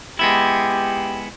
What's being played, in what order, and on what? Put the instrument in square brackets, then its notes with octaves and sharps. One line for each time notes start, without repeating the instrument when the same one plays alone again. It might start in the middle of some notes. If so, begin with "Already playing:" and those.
[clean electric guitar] G#3 B3 E4 [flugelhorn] G4